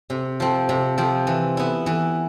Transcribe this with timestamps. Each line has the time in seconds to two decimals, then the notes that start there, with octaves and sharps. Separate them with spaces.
0.10 C3
0.40 F3 C4
0.69 C3
0.98 F3 C4
1.27 E3
1.57 B3 E4
1.86 E3